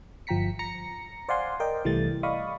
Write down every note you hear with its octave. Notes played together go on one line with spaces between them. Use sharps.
G1 F3 G5 A#5 B6 C#7
A#5 A#6 C#7
C5 D5 F5 F#5 G#5 C6
A#4 D5 D#5 G5
C2 E3 G3 A3 A6
D5 D#5 F5 B5 C#6 D#6